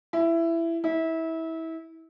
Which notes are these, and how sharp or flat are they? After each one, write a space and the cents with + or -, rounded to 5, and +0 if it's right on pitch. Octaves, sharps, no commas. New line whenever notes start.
E4 +15
E4 -25